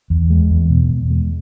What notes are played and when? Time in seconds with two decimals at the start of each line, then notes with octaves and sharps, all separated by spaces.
0.10 E2
0.30 G#3
0.51 E2
0.70 B2
0.90 E2
1.10 G#3